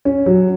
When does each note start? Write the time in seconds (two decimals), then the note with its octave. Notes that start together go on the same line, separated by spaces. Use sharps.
0.05 C#4
0.26 F#3